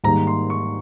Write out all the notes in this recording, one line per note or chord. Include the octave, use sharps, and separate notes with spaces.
G#2 D#3 G3 A#3 A#5
C6
C#6